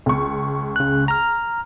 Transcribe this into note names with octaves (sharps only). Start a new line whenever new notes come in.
C#2 C#6
C#3 F#6
A#5 F6